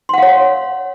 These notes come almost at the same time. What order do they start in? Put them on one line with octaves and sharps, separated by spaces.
C6 F#5 F5 C#5